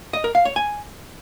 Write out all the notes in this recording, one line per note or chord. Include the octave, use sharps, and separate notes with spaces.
D#5
A#4
F5
C#5
G#5